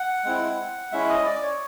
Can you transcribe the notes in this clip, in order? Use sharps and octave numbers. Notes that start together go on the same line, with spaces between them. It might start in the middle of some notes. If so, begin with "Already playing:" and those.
Already playing: F#5
G#3 C4 E4
G#3 C#4 E4 E5
D#5
D5
C#5